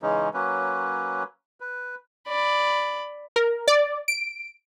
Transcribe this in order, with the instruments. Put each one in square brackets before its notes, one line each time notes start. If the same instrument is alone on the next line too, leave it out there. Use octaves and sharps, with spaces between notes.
[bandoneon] C#3 E3 G#3 C#4 D#4
F#3 A#3 C#4 B4
B4
[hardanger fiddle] D5 B5
[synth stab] A#4
D5
D7